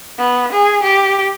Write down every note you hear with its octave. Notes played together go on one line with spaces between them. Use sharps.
B3
G#4
G4